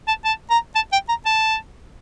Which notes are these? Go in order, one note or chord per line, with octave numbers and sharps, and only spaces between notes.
A5
A5
A#5
A5
G5
A#5
A5